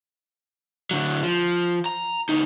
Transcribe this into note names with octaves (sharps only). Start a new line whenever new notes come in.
D3 F#3
F3
A#5
D2 D#4